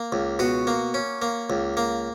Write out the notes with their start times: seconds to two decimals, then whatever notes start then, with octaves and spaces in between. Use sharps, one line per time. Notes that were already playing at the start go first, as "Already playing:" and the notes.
Already playing: A#3
0.12 C#2
0.39 B2 F#4
0.67 A#3
0.94 C#4
1.22 A#3
1.50 C#2
1.77 A#3